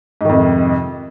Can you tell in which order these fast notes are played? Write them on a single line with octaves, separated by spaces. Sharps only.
G#2 D#3 F2 C3